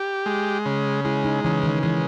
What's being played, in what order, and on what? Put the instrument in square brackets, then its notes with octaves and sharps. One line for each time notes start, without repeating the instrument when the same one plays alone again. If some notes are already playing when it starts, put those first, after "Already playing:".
Already playing: [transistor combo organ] G4
G#3
C#3
[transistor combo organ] G#3 [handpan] E4
[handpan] D#4
[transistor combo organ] C#3 [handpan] E3
[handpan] D#3
[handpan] E3 [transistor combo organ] G#3